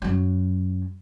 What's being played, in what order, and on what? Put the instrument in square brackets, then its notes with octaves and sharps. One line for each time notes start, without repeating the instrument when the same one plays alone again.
[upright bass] F#2 F#3